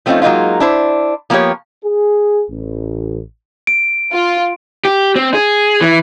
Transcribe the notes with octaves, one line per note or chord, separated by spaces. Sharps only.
F3 A3 C4 C#4 D#4 F4
F#3 G#3 A#3 D#4 F4
D4 E4 C5
F3 A#3 B3 E4 G4 C#5
G#4
A1
D7
F4
G4
C4
G#4
E3